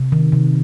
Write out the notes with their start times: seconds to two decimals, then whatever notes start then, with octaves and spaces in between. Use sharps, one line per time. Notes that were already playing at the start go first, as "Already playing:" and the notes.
Already playing: C3
0.12 D#3
0.32 C3